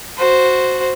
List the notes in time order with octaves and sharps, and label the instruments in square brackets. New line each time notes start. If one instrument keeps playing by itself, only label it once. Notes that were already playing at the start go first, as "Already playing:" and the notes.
[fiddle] F#4 C5